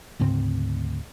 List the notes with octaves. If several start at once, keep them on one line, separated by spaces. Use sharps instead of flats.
D2 G#2 C#3 C4